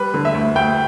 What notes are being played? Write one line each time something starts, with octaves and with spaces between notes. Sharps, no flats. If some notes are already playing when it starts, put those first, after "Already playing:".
Already playing: G3 B4
D3
E5
D2
D2 G5